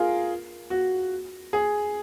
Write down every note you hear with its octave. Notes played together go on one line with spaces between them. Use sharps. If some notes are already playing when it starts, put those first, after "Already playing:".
Already playing: F4 G#4 A#4
F#4
G#4